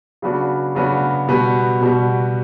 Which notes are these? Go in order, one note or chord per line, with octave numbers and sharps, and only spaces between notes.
C#3 F#3 B3 D4 F#4
C#3 F#3 B3 D4 F#4
B2 G3 B3 F#4
B2 G3 B3 F#4